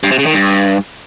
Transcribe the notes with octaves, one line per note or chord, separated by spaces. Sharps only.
G2
C3
C#3
D#3
G2